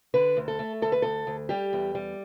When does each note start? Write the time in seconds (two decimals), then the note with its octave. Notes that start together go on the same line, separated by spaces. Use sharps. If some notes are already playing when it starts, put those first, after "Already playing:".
0.14 D3 B4
0.37 D2
0.48 A4
0.59 A3
0.82 D2 A4
0.92 B4
1.02 D2 A4
1.27 D2
1.49 G3 G4
1.73 E2
1.95 G3